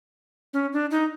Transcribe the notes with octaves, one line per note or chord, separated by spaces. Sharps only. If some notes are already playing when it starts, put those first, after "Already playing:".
C#4
D4
D#4